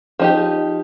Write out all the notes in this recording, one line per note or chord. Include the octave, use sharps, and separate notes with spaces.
F3 D#4 G4